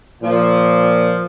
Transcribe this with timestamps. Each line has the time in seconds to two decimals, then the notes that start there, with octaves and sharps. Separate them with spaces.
0.22 A#2 F3